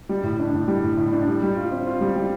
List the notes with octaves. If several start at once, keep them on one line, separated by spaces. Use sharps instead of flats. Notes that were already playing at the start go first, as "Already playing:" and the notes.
G3
A2
D4
A2
G3
A2
A2
D4
G3
G3
F4
C4
F4
G3
G3